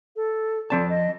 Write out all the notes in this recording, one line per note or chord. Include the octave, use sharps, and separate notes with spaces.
A4
F3 C4 D5 A5
D#5